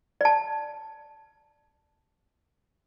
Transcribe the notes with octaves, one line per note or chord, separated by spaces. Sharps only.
D5 A5